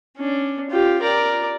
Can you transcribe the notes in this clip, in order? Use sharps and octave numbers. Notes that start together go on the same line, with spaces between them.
C#4 D4
F4 G4
A#4 D5